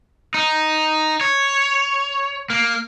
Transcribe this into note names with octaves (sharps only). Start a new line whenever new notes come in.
D#4
C#5
A#3